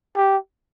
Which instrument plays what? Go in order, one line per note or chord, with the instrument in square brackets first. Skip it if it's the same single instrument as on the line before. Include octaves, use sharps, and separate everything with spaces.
[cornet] G4